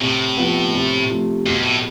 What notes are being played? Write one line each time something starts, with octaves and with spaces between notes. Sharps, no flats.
A2 C3
F3 B3
C3
F3 A3
F2 B2
A2